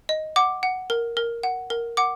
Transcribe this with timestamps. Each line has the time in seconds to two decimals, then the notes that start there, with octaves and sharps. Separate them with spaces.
0.09 D#5
0.36 F#5 D6
0.63 F#5
0.90 A#4
1.17 A#4
1.43 F#5
1.70 A#4
1.97 F#5 D6